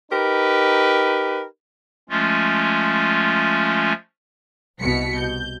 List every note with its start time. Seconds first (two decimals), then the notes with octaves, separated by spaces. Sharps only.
0.12 D#4 G4 A#4 B4
2.10 F3 G#3 A3 C#4 F4
4.79 C2 B2 B6 C#7
5.17 G6